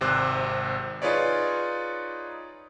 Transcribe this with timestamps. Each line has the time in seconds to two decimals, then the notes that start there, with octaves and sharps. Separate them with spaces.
0.01 G#1 C3 C5 D6 F#6
1.02 D#4 F4 G#4 B4 C#5 D5